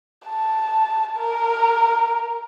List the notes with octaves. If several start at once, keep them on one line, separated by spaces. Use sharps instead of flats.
A5
A#4